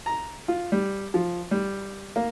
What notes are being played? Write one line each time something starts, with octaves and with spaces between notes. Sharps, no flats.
A#5
F4
G3
F3
G3
A#3